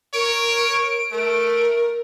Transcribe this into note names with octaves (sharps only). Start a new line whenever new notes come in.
A#4 C#5 D7
A3 A#4